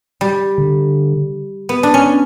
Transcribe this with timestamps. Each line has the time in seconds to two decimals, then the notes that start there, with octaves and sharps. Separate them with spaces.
0.21 G3
0.58 D3
1.69 B3
1.83 D4
1.94 C#4